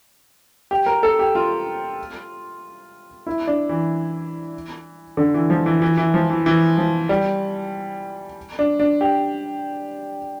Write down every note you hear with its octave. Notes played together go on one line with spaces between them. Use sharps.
G4
A#4
A4
G4
F4
E4
D4
E3
D3
E3
F3
E3
E3
E3
F3
E3
E3
F3
G3
D4
D4
G4